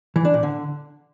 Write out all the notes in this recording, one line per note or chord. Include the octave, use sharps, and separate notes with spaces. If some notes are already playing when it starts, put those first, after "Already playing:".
E3
D4
A#2
D3